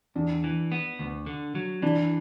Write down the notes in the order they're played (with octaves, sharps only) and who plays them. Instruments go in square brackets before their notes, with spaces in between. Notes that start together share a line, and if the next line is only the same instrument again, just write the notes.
[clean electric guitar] E2 [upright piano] D4
[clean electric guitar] E3
B3
D2
D3
F#3
[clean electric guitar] E3 [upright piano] D4